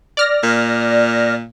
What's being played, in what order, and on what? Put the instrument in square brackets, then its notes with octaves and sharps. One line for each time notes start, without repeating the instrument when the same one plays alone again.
[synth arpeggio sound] D5 F6 A#6
[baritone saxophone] A#2